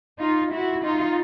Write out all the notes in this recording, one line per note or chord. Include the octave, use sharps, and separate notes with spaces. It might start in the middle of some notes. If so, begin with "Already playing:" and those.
D#4 F4
E4 F#4
D#4 F4